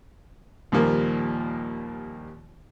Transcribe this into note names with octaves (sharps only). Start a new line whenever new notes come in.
D#2 A#2 F3 G3 A#3